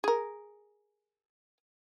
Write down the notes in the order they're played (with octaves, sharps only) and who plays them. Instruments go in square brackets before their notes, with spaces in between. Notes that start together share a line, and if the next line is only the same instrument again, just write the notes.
[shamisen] G#4 A#4